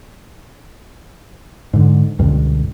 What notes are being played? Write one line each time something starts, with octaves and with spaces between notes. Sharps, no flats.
G#2 D3
C#2 G2 B2 D3